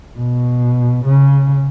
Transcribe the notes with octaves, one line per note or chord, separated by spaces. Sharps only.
B2
C#3